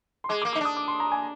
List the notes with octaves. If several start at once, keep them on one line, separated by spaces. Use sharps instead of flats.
C6
G#3 D6
D6
A#3
D#4 D6
D4 D#6
D6
C6
A#5
G#5